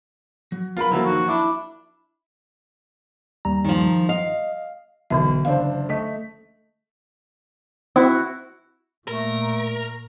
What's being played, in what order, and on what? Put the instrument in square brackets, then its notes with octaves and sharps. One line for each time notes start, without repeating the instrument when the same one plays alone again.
[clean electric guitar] F#3
[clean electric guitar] B3 B4 [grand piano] F4 A#4 B5
[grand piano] F3 F#3 A#3 [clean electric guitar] D4 A4 A#5 [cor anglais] E4
[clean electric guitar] F#2 D#3 [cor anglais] F#4
[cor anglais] D4 [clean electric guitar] E4
[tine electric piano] D#2 G3 A#5
[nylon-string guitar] D#3 F3
[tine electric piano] D#5 [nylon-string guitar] F5
[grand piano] B1 [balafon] D3 E3 E5
[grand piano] F#1 D4 C5 [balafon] F5
[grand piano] A3 D#5 B6
[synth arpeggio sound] C4 [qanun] E4 F#4
[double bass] A#2 [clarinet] A3 [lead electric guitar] A#4